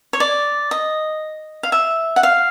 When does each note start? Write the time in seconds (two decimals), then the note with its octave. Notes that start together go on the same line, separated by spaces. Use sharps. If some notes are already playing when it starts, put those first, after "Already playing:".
0.13 C#5
0.20 D5
0.71 D#5
1.63 F5
1.72 E5
2.16 F#5
2.23 F5